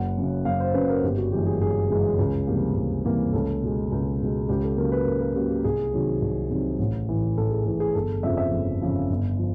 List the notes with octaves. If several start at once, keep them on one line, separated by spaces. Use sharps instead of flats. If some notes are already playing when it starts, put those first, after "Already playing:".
Already playing: F#1 F#5
F#2 C#3
F#1 F5
C5
F#2 C#3 B4
A#4
G1 G4
F#4
F#2 C#3 E3 G#3 G4
G#4
G1 G#4
F#2 C#3 E3 G#3
C#2
C3 E3 G3 A#3
C#2
C3 E3 G3 A#3
C#2 A4
B2 G#3
C#2
B2 G#3
C#2 G4
A4
C#3 F#3 A#3 A#4
B4
C#2 A#4
A#4
C#3 F#3 A#3 G4
G4
C2 G#4
C3 D#3 F#3
C2
C3 D#3 F#3
A1
A2 E3
A1 A4
G#4
A2 E3 A4
G#4
G1 A4
F2 C#3 F3 E5
E5
G1
F2 C#3 F3
G1
F3